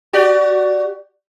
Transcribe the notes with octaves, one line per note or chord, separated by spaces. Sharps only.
F#4 G4 D5